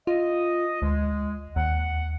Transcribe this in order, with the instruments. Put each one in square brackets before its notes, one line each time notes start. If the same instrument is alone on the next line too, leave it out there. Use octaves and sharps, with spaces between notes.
[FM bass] F4 [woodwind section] D#5
[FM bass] D2 [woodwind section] G#3
[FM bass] D#2 [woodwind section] F#5